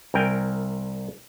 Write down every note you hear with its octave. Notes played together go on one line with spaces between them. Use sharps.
C2 A#4 G5 G#5